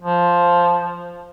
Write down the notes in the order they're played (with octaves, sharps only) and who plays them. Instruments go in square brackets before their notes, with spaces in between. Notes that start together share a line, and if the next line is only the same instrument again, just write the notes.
[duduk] F3